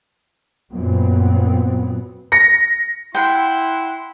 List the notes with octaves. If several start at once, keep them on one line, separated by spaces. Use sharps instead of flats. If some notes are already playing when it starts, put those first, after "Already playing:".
F#2 A#2 F#3 B3 C4
A#6 C#7
E4 F#5 G5 C6